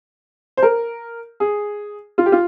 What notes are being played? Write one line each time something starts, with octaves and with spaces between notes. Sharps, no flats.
C5
A#4
G#4
F4
G4
F4